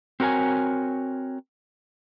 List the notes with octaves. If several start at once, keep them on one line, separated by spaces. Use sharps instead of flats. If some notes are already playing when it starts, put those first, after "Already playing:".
C4 F#4 A#4 C#5 G#5